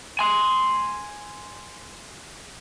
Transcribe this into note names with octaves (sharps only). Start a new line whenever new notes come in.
G#5 C6